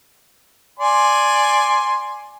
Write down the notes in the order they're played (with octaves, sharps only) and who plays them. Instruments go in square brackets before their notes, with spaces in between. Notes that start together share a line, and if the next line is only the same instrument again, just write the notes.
[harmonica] D5 G#5 C6